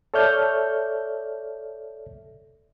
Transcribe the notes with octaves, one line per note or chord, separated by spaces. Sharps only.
A4 C#5 D5 E5 F6 G6